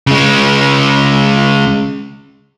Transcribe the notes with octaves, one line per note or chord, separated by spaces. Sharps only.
C#3 G#3